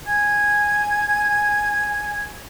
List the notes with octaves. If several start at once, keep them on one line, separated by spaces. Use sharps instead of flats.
G#5 G#6